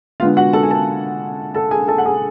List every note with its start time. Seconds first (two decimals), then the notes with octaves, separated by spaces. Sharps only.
0.20 D3 G#3 B3 F4 F5
0.37 F#4 F#5
0.53 A4 A5
0.63 G#5
0.70 A4 A5
1.55 A4 A5
1.71 G#4 G#5
1.88 A4 A5
1.98 F#5
2.05 G#4 G#5